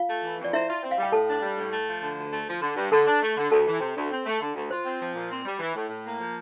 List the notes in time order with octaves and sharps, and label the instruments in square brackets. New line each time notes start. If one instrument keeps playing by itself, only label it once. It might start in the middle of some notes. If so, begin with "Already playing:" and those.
Already playing: [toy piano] F4 F5
[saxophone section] A3
E3
F2
[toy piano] D5
[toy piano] E4 E5 [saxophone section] C5
[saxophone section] F4
C4
[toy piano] F5
[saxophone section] G3 [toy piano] G5
[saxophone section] A2 [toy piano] A4 A5
[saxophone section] D4
G3
A2
A3
F3
D3
D2
A3
F3
D3
G2
[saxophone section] D3 [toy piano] A4 A5
[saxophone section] D4
A3
D3
[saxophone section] D2 [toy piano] A4 A5
[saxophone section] E3
C3
D2
C4
A3
D3
D2
[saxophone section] F4 [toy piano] C5
[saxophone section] C4
F3
A#2
C4
G3
E3
A2
A2
A#3
F3